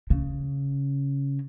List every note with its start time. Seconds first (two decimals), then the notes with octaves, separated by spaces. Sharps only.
0.10 C#3